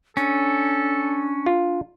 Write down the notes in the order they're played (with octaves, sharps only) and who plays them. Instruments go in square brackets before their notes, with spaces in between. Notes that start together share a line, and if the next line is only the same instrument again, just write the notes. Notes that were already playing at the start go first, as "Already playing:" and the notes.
[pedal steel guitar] C#4 [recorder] D4 [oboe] A4
[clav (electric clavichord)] F4